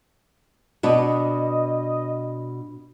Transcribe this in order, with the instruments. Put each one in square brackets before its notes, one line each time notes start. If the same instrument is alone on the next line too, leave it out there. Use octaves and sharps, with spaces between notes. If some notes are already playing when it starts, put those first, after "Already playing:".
[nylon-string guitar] B2 B3 D4 [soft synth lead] D#5